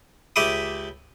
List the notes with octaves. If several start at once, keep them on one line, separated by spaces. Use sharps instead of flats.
C#2 G4 E5 B5 D6 D#6